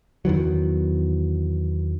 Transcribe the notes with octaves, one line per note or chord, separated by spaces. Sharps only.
E2 D#3 E3 F#3